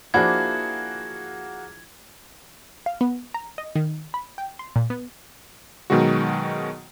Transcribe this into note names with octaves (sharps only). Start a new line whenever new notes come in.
F3 A#3 D4 E4 F#4 G#4 G#6
F5
B3
A#5
D#5
D#3
B5
G5
C6
A#2
B3
B2 D#3 F#3 G#3 F#4